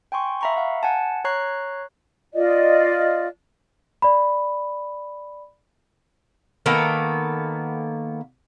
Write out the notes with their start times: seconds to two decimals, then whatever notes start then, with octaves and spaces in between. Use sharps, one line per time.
0.12 G5 G#5 C6 C#6
0.41 E5 F5 A#5 B5 C#6
0.55 F5 F#5 A#5
0.83 F#5 G#5 A5
1.25 C#5 A#5 C#6 F#6 C7
2.34 F4 D5 D#5
4.02 D5 B5
6.66 D#3 A#3 B3 A4